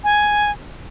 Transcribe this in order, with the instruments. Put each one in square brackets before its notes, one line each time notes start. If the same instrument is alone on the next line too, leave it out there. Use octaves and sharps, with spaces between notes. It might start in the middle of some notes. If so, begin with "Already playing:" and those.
[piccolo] G#5